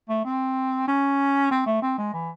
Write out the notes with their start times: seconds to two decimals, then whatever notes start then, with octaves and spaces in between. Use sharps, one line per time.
0.09 A3
0.25 C4
0.88 C#4
1.51 C4
1.66 A3
1.82 C4
1.98 G#3
2.13 E3